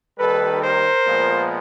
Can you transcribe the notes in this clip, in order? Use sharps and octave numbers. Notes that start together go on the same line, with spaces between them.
D#2 D#3 G3 A4 B4
A#4 C5
A#2 F3 G#3 B3